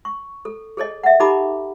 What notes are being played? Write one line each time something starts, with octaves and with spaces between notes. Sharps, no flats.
C#6
A4
G#4 A4 C#5 D#5
E5 F#5
D#4 G4 A4 A#5 B5 D6